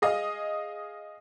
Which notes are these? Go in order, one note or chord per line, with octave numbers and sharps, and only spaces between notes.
G#4 D#5 F5